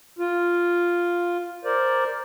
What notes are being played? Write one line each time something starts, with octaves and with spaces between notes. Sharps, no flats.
F4
A#4 C5 D5